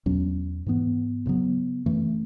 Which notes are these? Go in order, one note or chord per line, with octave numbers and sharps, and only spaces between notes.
E2 B2 F#3 C#4
G#2 E3 B3
D2 C#3 F#3 B3
F#2 E3 A3